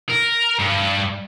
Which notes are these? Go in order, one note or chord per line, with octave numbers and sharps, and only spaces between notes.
A#4
G2